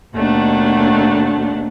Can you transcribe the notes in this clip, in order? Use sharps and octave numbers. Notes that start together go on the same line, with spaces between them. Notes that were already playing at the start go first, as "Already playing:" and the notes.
D#2 B2 A3 D4 F#5